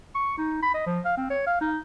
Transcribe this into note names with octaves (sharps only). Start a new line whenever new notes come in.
C#6
D#4
B5
D#5
F3
F5
C4
C#5
F5
D#4